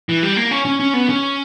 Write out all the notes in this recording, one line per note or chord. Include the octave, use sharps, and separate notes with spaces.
E3
G3
A#3
C#4
C#4
C#4
B3
C#4